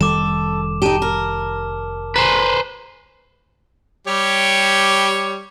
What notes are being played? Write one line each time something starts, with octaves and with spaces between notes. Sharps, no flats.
F1 D#3 G3 A4 D6 E7
D#4 G4 A5 E7 G7
A#4
B4 C5 G#5 A#5
G3 G4 C#5